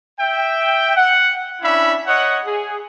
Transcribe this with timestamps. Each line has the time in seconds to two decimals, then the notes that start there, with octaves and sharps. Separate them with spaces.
0.19 E5 G5
0.95 F#5
1.62 C#4 D4 E4 E5 B5
2.06 C#5 D#5 F#5
2.45 G#4